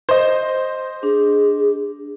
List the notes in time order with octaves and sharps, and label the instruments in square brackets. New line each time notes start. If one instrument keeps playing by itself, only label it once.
[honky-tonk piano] C5 D#5
[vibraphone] D4 [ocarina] G#4